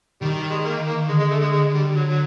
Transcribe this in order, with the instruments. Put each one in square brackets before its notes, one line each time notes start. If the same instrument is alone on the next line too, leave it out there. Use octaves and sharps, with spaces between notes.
[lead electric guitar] D#3 [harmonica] G3
[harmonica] G3
G#3
A#3
A#3
[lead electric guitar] D3 [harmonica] G#3
[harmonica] G#3
A3
G#3
G#3
G3
F#3
F#3